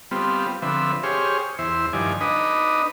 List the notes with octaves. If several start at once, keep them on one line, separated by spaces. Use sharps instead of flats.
G3 B3 C4 F4
D3 F3 C4 B4 E5
G4 G#4 C5 C#5 F6
E2 C5 E5
G2 D#3 F3 D5 G#5
D4 D#4 B4 D#5